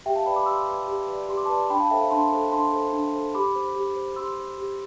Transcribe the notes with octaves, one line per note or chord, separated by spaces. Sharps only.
G4 E5 G5
F5 A5
B4 D5 G5 B5
B5 D6
G4 C6 E6
B4 D5
G4
B4
D5
G4 C6
D6
A5 C6
B4 D5
D4 G5 B5
F5 A5
A4 C5 E5 G5
F5
D4 A5 C6
A4 C5
D4 A5 C6
A4 C5
D4
A4 C5
G4 B5 D6
C5
G4
C5
G4 C6 E6
C5
G4